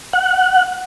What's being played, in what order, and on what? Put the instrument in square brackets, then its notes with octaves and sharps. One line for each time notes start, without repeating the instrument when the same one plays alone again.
[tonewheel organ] F#5